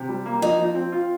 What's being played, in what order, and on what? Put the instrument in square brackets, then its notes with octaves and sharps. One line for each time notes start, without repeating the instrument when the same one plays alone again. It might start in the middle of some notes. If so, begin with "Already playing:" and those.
Already playing: [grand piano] C3
G3
A#3
[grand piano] F3 [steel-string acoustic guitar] D#4
[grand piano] F3
C4
F4